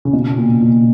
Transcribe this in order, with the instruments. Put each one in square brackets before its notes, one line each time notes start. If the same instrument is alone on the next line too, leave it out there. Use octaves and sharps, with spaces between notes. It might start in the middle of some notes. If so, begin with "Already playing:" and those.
[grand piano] C#3
B2
A#2
A#2